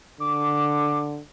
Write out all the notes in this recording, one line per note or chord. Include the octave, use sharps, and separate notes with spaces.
D3 D6